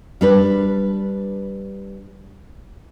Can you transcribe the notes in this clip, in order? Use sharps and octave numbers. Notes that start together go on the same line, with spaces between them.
G3 D4 B4